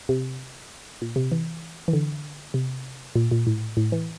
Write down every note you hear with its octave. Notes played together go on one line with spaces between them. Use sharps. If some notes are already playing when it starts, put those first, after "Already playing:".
C3
A#2
C3
E3
E3
D3
C3
A#2
A#2
A2
A2
E3